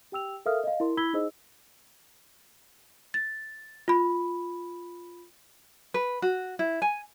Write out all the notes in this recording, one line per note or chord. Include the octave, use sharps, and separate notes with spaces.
G4 G5 E6 F7
A4 A#4 E5 F5 D#6 F6
D#5 F5
E4 A#4 C6
E4 B5 E6 G#6 B6 G7
D#4 G#4 C5 D#5 E6
A6
F4 B5
B4
F#4
E4
G#5